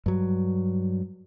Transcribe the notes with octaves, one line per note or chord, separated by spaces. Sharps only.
G2 F#3